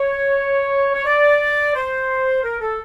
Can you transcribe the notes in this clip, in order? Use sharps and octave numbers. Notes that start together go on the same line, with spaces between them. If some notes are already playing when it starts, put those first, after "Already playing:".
Already playing: C#5
C#5
D5
C5
A#4
A4